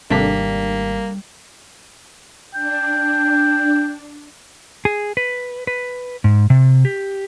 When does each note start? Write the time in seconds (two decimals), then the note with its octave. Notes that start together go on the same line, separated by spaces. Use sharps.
0.10 G#1 C3 G3 A3 A#3 D4 B6
2.54 D4 G5
4.85 G#4
5.17 B4
5.67 B4
6.24 G#2
6.50 C3
6.85 G4